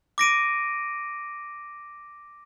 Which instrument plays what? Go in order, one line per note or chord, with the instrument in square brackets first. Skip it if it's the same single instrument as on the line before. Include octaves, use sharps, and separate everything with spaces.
[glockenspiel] D6 A#6 D7 D#7